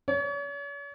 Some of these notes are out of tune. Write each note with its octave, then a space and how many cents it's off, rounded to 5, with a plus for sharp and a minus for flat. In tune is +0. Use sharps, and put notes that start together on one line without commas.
C#5 +40